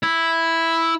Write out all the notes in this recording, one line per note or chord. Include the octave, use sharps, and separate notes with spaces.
E4